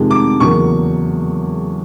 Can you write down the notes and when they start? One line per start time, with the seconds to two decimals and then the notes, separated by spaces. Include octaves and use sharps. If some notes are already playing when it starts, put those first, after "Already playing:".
Already playing: F2 C3 D#3 G#3
0.11 D6
0.40 E2 C#3 F#3 A#3 C#6